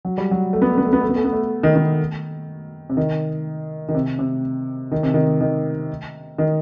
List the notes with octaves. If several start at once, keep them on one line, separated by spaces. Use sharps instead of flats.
F#3
G3
F#3
A3
B3
A3
B3
A3
B3
A3
B3
A3
B3
A3
D#3
D#3
C3
D#3
D#3
C3
C3
D#3
C3
D#3
D#3
D#3